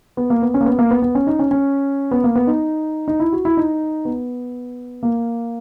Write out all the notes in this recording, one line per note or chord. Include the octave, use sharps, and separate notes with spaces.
B3
A#3
B3
C#4
A#3
B3
A#3
B3
B3
C#4
D#4
C#4
C#4
B3
A#3
B3
D#4
D#4
E4
F#4
E4
D#4
B3
A#3